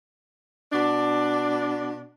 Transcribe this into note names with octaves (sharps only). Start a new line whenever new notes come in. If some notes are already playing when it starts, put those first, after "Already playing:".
B2 D4